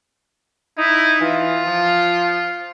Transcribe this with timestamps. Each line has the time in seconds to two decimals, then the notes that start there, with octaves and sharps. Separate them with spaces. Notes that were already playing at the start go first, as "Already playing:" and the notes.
0.78 D#4 E4
1.21 E3 F4
1.66 F3